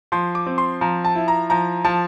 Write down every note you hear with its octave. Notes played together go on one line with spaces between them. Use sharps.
F3 C6
D6
C4
C6
F3 A#5
A5
E4
A#5
F3 A#5
F3 A5